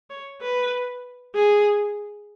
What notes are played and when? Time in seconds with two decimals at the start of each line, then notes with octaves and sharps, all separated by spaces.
0.10 C#5
0.41 B4
1.35 G#4